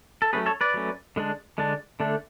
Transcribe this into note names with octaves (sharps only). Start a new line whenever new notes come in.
A4
F#3 A3 C#4 G#4 B4
A4 C#5
B4 D5
F#3 A3 C#4
D3 G#3 D4
D3 G#3 D4
D3 A3 D4